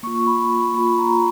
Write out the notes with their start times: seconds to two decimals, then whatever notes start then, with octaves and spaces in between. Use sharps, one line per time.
0.03 A#3 F4 C#6
0.27 B5
0.74 A#3 F4 B5
0.99 A#5